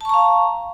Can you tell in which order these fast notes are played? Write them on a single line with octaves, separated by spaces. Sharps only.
A5 C#6 A#5 F5